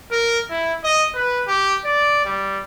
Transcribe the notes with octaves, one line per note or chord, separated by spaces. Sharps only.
A#4
E4
D#5
B4
G4
D5
G3